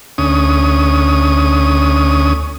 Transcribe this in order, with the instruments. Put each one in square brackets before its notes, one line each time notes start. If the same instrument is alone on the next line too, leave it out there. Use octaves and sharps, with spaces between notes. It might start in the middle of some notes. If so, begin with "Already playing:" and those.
[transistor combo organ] D2 C#4 D#6